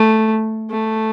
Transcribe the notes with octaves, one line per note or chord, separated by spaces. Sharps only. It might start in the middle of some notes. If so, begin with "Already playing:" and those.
Already playing: A3
A3